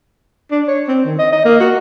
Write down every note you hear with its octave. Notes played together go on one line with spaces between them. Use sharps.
D4
C#5
C4
D#3
D#5
D#5
A#3
F#4